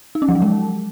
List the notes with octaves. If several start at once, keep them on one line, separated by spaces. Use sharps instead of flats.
D#4
C#4
F3
F#3
G#3